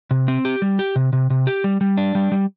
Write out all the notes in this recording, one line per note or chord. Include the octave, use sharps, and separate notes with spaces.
C3
C4
G4
G3
G4
C3
C3
C3
G4
G3
G3
D4
G3
G3